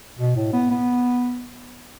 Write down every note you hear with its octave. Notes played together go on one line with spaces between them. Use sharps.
B2
A2
B3
B3